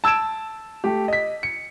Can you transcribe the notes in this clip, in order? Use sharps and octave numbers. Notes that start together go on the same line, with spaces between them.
A5 E6 G#6 D7 E7
A3 G4
D#5 B6
C#7